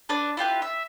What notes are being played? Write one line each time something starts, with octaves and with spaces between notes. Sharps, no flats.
D4 B4
E4 F4 G4 B4
E5